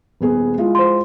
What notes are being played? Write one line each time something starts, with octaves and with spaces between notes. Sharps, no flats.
D#1 B3 G#4
G#3 E4 F4
C5 C6